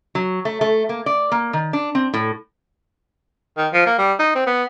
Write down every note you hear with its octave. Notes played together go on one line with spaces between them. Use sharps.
F#3
A3
A3
A#3
D5
A#3
D#3
D4
C4
A2
D#3
F3
A#3
G3
D#4
C4
B3